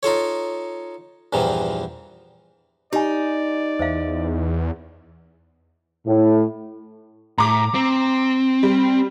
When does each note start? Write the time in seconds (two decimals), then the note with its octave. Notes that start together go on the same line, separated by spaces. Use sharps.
0.03 D#4 F4 A4 C#5
1.33 E2 G2 A#2 E3 F3
2.93 D#4 G4 D5 G#5
3.79 E2 C5 E5 F5
6.07 A2
7.38 A2 A#5 D6
7.74 C4
8.63 G3